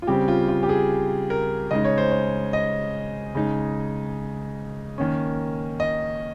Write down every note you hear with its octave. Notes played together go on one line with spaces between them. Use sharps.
F4
C#3 G3 C4 G4
F4
F4
G4
G#4
A#4
C#3 G#3 D#4 D#5
C#5
C5
C#5
D#5
C#3 G#3 D#4
D#3 A#3 C#4
D#5